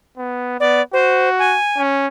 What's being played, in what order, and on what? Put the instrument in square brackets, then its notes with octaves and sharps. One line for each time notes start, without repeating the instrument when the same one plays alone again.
[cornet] B3
[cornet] B3 [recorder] D5
[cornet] F#4 [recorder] C5
[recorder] G#5
[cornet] C#4